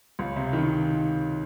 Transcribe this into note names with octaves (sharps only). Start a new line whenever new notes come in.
C#2
C3
D#3